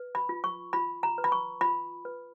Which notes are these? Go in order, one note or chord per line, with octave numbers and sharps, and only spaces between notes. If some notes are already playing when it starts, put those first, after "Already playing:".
Already playing: B4
B5
F4
C#6
F4 B5
A#5
B4
B5
C#6
F4 B5
B4